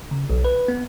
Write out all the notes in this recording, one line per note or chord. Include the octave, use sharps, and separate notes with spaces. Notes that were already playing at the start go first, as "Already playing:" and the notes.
C#3
B1
B4
B3